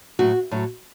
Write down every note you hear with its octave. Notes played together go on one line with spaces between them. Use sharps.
A2 F#3 F#4
A2 F#3